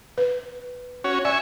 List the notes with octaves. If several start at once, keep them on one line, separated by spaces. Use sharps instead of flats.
B4
C#4 F#4 C#5
D5 E5 G#5 C#6